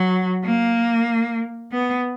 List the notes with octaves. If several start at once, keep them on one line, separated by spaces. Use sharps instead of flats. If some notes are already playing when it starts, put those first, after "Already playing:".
Already playing: F#3
A#3
B3